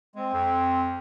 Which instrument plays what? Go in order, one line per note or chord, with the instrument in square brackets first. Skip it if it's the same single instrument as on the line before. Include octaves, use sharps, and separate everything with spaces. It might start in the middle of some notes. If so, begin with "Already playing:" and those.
[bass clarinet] G#3 [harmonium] C4
[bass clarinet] F2